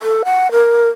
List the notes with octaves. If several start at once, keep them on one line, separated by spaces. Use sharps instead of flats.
A4
F#5
A#4